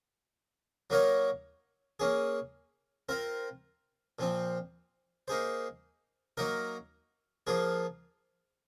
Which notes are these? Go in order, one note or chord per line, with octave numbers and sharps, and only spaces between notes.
F#3 A#3 D#4 A#4 C#5
A#3 C#4 G#4
C4 F4 A#4
A#2 F3 C4
A#3 D#4 G#4 C5
F#3 A#3 D#4 A#4
F3 A#3 F4 G#4